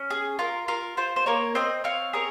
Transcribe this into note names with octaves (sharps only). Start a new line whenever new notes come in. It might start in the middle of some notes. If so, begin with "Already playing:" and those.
Already playing: C#4
G#4
F4 A#4
F4 A#4
F4 C5
C5
A#3 A#4 C#5
C4 C5 D#5
C4 C#5 F5
G#4 A#4 C#5